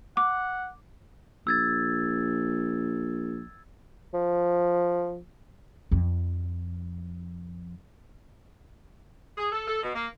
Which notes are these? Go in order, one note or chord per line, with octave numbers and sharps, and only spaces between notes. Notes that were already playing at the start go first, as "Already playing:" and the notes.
F#5 D6
A#1 E6 G#6 A6
F3
F2 F3
G#4
A4
A4
B2
A#3